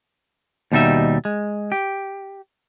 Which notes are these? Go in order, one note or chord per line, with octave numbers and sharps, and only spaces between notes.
D#2 B2 G3 D#4 E5
G#3
G4